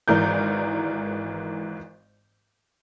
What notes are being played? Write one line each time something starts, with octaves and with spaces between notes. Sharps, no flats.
G#1 G#2 E3 A#4 D5 G6